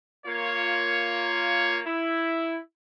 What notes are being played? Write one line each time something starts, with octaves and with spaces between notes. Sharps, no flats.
A#3 F4 C#5
E4